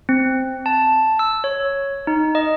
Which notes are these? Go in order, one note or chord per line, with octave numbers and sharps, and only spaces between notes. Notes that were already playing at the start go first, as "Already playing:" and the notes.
C4
A5
E6
C#5
D#4
D#5